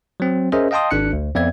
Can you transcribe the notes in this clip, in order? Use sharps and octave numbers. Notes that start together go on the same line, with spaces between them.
F#3 C4
C#4 G#4 A#4 C5 D#5 E5
D#5 F5 G5 A5 C6 D#6
G#1 D4 F#6 C#7
D2
F2 B3 C4 D5 E5 G#6